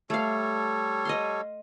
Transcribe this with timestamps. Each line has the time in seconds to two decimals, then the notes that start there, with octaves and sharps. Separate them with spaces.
0.10 G3 A3 A4 C#5 F5
1.05 D#5 F5 C6